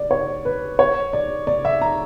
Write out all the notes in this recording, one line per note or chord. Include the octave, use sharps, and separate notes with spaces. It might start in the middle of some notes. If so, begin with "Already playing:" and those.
Already playing: D5
C#5
B4
C#5
D5
D5
E5
A#5